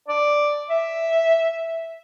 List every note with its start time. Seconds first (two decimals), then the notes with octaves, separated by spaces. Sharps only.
0.08 D5
0.70 E5